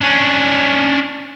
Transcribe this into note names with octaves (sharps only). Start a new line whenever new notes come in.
C#4 D4